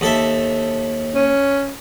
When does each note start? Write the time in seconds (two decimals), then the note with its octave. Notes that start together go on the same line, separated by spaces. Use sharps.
0.01 D#2 A4 E5
1.15 C#4